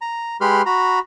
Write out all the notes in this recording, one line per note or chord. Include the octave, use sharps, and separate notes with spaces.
A#5
G#3 G4 B4 B5 C6 F6
F#4 A#5 B5